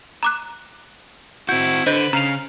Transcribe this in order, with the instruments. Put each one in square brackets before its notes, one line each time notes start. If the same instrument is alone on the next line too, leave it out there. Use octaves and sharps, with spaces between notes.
[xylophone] A#5 D6 F#6
[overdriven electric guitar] C4 F#4 [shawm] E4 [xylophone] G6
[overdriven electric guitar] D3 [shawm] B4 [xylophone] C5 D#5 G6
[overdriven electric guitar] C#3 [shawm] F5 [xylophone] A#5 F7